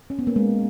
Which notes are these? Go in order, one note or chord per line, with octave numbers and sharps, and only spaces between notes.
C#4
B3
A#3
G#3